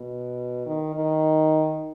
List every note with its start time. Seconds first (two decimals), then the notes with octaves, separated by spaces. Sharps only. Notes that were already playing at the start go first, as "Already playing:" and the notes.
Already playing: B2
0.66 D#3
0.95 D#3